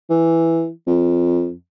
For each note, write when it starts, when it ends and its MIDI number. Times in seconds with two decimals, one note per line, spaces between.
0.10 0.69 52
0.87 1.52 41